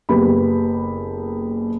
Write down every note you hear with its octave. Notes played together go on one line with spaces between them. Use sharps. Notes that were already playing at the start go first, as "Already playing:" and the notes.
F#1 B3 G4 B5